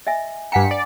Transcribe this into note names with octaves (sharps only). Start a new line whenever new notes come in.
D#5 E5 G#5
G2 F#5 G#5 A#5 B6 C#7
D5